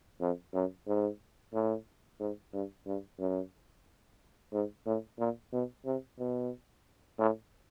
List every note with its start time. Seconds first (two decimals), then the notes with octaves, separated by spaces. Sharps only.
0.21 F2
0.54 F#2
0.87 G#2
1.53 A2
2.20 G#2
2.53 G2
2.87 G2
3.19 F#2
4.53 G#2
4.86 A2
5.19 A#2
5.53 B2
5.85 C3
6.19 B2
7.19 A2